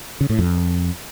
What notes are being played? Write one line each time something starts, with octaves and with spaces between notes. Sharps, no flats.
C#3
A2
F2